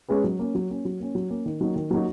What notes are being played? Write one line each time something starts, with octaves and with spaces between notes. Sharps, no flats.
G#3 C#4 G#4 B4
F#3
A#3 C#4
F#3
A#3 C#4
F#3
A#3 C#4
F#3
A#3 C#4
D#3
F#3 A#3 D#4 F#4
D#3
F#3 A#3 D#4 F#4